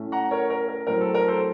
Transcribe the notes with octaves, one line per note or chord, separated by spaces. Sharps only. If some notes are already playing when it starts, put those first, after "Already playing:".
Already playing: A2 A3 C#4
F#5 A#5
A#4 C#5
A#4
A#4
A2 F#3 A3 C4 A#4
A4
A#4
A4 C5